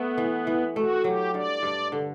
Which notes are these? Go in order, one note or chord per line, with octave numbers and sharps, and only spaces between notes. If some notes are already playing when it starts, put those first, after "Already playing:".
Already playing: A3 B3
E3
E3
A3 F#4
F#3 G4
G2 D5
G2
D3